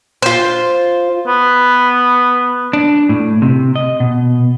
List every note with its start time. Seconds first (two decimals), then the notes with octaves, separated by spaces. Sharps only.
0.22 F4 C5
1.27 B3
2.73 D4
3.09 A2
3.42 C3
3.76 D#5
4.00 B2